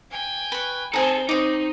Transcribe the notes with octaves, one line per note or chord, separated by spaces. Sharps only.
G5 G#5
B4 C#6
C4 D#4 G#4 A4 C5 G#5
C4 D#4 C#5 D6